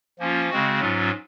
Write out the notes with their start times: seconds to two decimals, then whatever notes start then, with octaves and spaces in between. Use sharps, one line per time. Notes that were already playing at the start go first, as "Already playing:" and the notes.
0.19 F3 A#3 C#4 F4
0.50 C#3 G#3 C4 F#4
0.80 G#2 F#3 C#4 F4